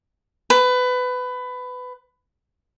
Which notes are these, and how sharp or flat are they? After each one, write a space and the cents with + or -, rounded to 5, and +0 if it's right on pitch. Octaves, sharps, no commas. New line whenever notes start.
B4 +20